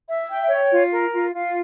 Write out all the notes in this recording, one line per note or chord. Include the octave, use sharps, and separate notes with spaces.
E5
G5
C#5
F4
A#4
F4
F4